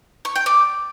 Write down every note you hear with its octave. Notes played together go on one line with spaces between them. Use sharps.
C#6
G5
D5